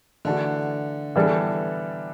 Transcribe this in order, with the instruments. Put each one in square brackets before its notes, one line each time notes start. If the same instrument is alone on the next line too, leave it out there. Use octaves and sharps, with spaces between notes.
[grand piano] D3 [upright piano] E3 A3 D4 F#4
[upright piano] E3 G3 B3 D4 A4